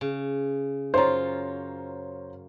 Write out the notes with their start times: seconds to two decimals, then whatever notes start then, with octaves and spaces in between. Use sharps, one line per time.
0.01 C#3
0.94 F#2 F4 C5 C#5 A#5